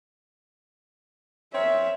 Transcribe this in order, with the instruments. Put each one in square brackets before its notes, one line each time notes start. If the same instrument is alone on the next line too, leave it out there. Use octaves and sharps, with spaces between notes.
[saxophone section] C4 A#4 C#5 [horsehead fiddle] E5